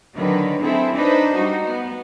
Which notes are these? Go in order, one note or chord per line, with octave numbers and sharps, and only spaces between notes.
D3 D#3 F#3 B4
C4 E4 G#4 A4
D4 D#4 B4 C5
G3 D#4 F#4
B3